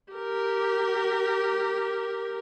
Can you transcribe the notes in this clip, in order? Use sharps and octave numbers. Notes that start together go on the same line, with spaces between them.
G4 A#4